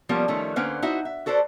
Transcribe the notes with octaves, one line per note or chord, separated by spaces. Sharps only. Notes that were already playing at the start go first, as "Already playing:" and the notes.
F3 G3 A#3 B3 C#4
D#3 F3 G3 A3 C#4
D3 A#3 C#4 B4 C5 F#5
D#4 E4 F#4 C5 E5
E5
F#4 A4 B4 C5 D5